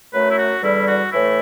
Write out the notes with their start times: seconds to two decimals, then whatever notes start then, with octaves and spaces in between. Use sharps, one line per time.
0.13 F#2 F#3 A3 B4
0.31 E4
0.38 F#4
0.62 E2 D3 G3 E4
0.88 F#4
1.12 A2 E3 A3 E4